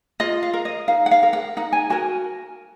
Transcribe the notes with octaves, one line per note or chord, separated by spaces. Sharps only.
F4 D#5
F5
A#4
D#5
D#4 F5
F#5
F5
A#4
F#5
D#4 F#5
G#5
F#4 A#4 G#5